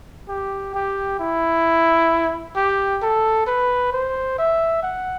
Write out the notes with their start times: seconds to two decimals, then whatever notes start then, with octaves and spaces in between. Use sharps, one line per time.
0.28 G4
0.74 G4
1.19 E4
2.56 G4
3.02 A4
3.47 B4
3.93 C5
4.38 E5
4.83 F#5